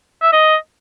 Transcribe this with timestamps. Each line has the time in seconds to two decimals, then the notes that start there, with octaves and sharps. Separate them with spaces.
0.22 E5
0.33 D#5